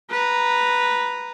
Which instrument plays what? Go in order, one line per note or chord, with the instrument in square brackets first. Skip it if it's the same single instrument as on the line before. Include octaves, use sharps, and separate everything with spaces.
[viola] B4 A#5